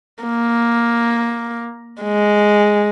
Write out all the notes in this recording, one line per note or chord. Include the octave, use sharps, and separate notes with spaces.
A#3
G#3